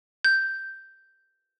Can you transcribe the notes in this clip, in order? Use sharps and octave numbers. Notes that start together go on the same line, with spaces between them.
G6